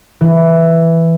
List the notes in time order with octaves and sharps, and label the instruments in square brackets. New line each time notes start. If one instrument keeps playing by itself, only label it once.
[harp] E3